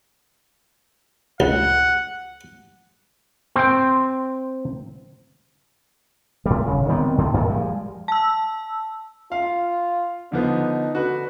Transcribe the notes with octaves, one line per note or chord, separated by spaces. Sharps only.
C#2 F#5
C4 G5
A2 G3
E1 C#3
D#3 G3 B3 C4
A2 D3 D#3 G3
F#2 A#2 D3
F3 G3 G#3
A5 E6
F4 F5
D3 F3 B3 D#4
D3 F#4 B4